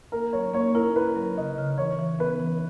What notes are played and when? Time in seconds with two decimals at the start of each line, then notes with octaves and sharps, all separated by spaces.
0.12 A#3 A#4
0.33 F#3 C#5
0.54 A#3 C#5
0.75 E4 A#4
0.95 E4 B4
1.16 F#3
1.37 C#3 D#5
1.58 C#3
1.78 E3 C#5
1.99 E3
2.19 B3 B4
2.40 E3